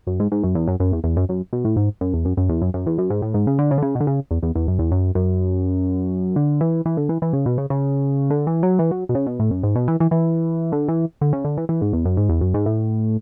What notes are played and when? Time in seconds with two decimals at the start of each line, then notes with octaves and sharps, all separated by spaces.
0.07 F#2
0.20 G#2
0.32 G#2
0.44 F#2
0.55 E2
0.68 F#2
0.80 F#2
0.92 E2
1.04 E2
1.17 F#2
1.29 F#2
1.53 B2
1.65 A2
1.76 G#2
2.01 F#2
2.14 E2
2.25 F#2
2.37 F#2
2.49 E2
2.62 F#2
2.74 F#2
2.86 E2
2.98 F#2
3.10 G#2
3.22 A2
3.34 G#2
3.47 C#3
3.59 D3
3.71 C#3
3.78 D3
3.83 C#3
3.95 B2
4.00 D3
4.07 C#3
4.31 E2
4.43 E2
4.55 E2
4.68 F#2
4.79 E2
4.92 F#2
5.15 F#2
6.36 D3
6.61 E3
6.85 E3
6.97 D3
7.09 E3
7.22 E3
7.33 C#3
7.46 B2
7.58 C#3
7.70 C#3
8.30 D3
8.47 E3
8.63 F#3
8.79 E3
8.91 F#3
9.09 B2
9.15 C#3
9.27 B2
9.40 A2
9.51 F#2
9.63 G#2
9.76 B2
9.88 E3
10.00 E3
10.11 E3
10.72 D3
10.88 E3
11.21 D3
11.33 C#3
11.45 D3
11.57 E3
11.69 E3
11.81 G#2
11.93 E2
12.05 F#2
12.17 G#2
12.29 E2
12.41 F#2
12.54 G#2
12.66 A2